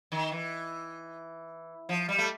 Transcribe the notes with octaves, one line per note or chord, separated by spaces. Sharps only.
D#3
E3
F3
G3
A3